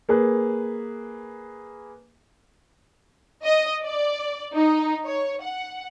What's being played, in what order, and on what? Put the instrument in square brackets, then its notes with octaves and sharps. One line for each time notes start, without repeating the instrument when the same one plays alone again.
[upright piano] A#3 G#4 B4
[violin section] D#5
D5
D#4
C#5
F#5